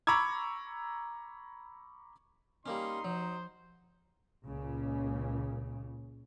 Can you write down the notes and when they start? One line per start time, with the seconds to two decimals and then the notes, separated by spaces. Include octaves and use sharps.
0.07 A#5 B5 C#6 D6 E6 G#6
2.66 G3 A#3 C#4 D#4 C6
3.04 F3 F#3 C5
4.45 C#2 A#2 C#3